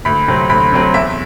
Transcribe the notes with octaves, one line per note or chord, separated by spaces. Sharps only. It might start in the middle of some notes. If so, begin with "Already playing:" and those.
D2 B5
C3 F#3 C4
D2 B5
C3 F#3 C4
E2 E5